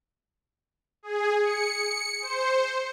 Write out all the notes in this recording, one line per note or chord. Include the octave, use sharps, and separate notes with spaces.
G#4
C#7
C5